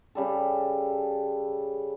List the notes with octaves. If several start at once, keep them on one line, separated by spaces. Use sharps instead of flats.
C#3 G3 A4